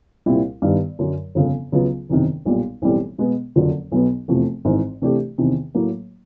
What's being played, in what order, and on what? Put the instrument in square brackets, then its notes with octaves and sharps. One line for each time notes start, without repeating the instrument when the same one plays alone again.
[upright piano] C2 A#2 G3 C4 E4
G2 D#3 G3 B3
F#2 D3 F#3
G1 F2 C#3
C#2 C#3 F#3 B3
F#1 E2 C3 D#3
B1 A#2 G3
B1 A2 E3 G3 C4
B2 G#3 B3
F#1 F2 D3 F#3
B1 B2 F#3 B3
F1 E2 C3 F3 A3
G#1 G#2 E3
C3 E3 A3 D4 G4
E2 C3 D#3
A2 F#3 A#3